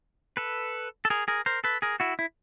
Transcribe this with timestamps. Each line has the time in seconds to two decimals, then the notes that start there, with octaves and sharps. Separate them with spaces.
0.37 A4 B4
1.05 A4
1.10 G#4 A#4
1.28 G#4 A#4
1.46 A#4 C5
1.64 A4 B4
1.82 G#4 A#4
2.00 E4 F#4
2.19 E4